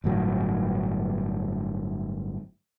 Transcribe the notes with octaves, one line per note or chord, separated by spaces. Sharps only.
G1 A2 F#3